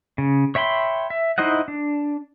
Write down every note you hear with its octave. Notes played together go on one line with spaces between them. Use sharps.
C#3
C#5 E5 G5 B5 C6
E5
D#4 E4 C5 D#5 F#5
D4